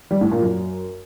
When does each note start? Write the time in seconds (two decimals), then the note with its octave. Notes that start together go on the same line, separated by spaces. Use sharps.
0.11 G3
0.21 A2
0.31 A#2
0.41 F#2